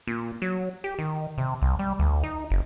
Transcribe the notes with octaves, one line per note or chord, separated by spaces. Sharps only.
A#2
F#3
G4
D#3
C3
C2
G3
D2
D#4
F#1